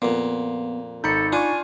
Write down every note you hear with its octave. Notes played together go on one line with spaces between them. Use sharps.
F2 A#2 B3
G#1 D#4 A4 A#5 B5 G6 C#7
D4 F4 G#5 C#6